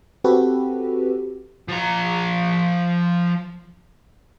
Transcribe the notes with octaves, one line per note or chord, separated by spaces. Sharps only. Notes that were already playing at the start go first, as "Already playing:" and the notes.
C4 F#4 G4 A4 B4
F3 A#5